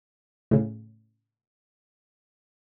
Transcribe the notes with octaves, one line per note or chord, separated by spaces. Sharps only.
A2 C#3